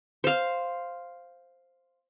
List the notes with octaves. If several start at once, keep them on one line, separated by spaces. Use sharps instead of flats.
C5 F5